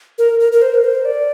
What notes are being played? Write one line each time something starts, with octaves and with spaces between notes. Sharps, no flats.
A#4
A#4
A#4
C5
A#4
C5
D5